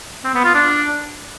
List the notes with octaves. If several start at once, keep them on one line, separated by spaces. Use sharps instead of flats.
C4
B3
F4
D4